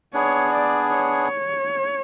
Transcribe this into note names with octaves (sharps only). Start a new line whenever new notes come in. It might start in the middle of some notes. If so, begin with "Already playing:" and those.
B3 D4 G#4 C#5
D5
C#5